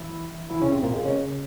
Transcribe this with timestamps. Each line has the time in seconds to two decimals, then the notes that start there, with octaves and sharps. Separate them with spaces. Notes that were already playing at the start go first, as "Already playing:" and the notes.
Already playing: E3 E4
0.50 E3 E4
0.61 C#3 C#4
0.72 C3 C4
0.83 A#2 A#3
0.94 G#3
1.05 C#3 C#4